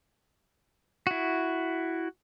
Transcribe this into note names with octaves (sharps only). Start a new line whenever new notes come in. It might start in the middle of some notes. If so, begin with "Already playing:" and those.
E4 F#4